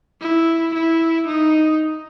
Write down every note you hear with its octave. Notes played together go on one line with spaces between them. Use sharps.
E4
E4
D#4